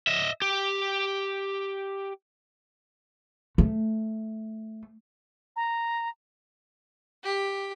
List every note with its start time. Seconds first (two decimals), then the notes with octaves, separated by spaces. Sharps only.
0.07 D#5 E5
0.42 G4
3.58 A3
5.56 A#5
7.23 G4